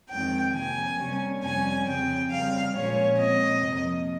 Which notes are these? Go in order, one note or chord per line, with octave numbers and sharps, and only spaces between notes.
F2 D#3 G#3 C4 G5
C3 F3 A#3 G#5
C3 G3 A#3 C#4
F2 C3 G3 C#4 G#5
F2 C#3 F3 C4 G5
C#3 G3 C4 F5
A#2 F3 G#3 C#4 C#5
A#2 G#3 C4 D#5
F2 C3 F3 A#3